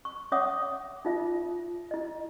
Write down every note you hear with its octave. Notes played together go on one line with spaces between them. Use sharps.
C#6
C#4 C#5 E5 F#5 D6 D#6
D#4 F4 E5
E4 D#5